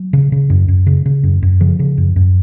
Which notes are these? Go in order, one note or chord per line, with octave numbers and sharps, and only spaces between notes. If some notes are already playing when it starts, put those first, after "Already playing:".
Already playing: F#3
C#3
C#3
F#2
F#2
C#3
C#3
F#2
F#2
C#3 F3
C#3
F#2
F#2